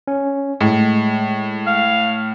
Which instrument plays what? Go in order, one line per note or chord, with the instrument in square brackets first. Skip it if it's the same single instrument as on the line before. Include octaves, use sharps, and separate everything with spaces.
[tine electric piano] C#4
[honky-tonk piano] A2 [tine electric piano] G#3
[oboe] F5